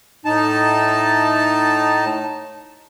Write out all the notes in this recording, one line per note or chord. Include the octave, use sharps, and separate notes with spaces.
A2 D#4 A5